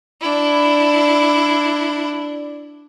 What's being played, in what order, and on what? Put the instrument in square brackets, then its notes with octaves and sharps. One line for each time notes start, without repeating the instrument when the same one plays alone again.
[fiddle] D4 E4